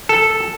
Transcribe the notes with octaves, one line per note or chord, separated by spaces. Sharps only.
A4